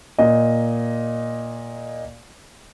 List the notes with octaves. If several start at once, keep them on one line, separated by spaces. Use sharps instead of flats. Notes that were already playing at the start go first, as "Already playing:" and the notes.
A#2 D#5